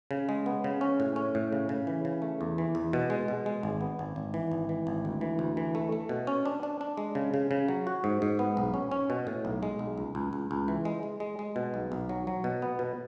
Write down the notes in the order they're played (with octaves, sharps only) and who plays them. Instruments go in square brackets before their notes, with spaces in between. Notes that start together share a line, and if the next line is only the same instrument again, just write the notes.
[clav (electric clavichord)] C#3
G#3
B3
C#3
C#4
A2
C#4
A2
C#3
C#3
E3
C#3
A3
E2
E3
E2
B2
G#3
B2
G#3
G#1
B3
G#1
G#1
E3
G#1
E3
G#1
D2
E3
D2
E3
A3
A3
B2
C#4
D4
D4
D4
G#3
C#3
C#3
C#3
F#3
F#4
G#2
G#2
B3
B1
C#4
C#4
B2
A2
B1
G#3
B1
C#2
C#2
C#2
C#2
E3
G#3
G#3
G#3
G#3
B2
B1
B1
F#3
F#3
B2
B3
B2